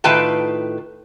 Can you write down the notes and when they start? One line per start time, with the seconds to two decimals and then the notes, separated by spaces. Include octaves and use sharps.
0.04 A2 D#3 F4 B4 G5 A5